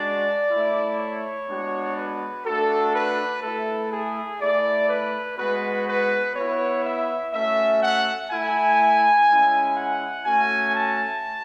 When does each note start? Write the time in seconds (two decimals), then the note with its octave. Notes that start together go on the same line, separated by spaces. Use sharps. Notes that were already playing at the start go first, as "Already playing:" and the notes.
Already playing: G#3 D4 F#4 D5
0.51 A3 E4
1.00 C#5
1.49 G#3 B3 D4 F#4
1.97 B4
2.46 A3 D4 F#4 A4
2.95 B4
3.43 A3 E4 A4
3.92 G#4
4.41 A3 E4 D5
4.90 B4
5.39 G#3 B3 F#4 B4
5.88 B4
6.35 B3 E4 C#5
6.85 E5
7.34 A3 C#4 F#4 E5
7.82 F#5
8.31 A3 E4 G#5
9.29 G#3 C#4 E4
9.77 F#5
10.25 A3 C#4 F#4 G#5
10.75 A5